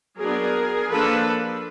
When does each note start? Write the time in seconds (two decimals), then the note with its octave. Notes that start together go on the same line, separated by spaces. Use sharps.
0.19 F#3 B3 D4 G#4 A#4
0.90 F3 A#3 D4 A4 B4